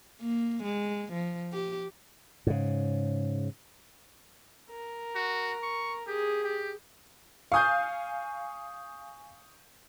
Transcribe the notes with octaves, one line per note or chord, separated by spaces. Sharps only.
A#3
G#3
F3
G4
G#2 C#3
A#4
F#4
C#6
G4 G#4
G4
F5 G#5 C#6 D#6 G6